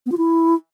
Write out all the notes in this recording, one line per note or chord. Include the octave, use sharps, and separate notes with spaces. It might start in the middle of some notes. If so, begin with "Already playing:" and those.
B3
F4
E4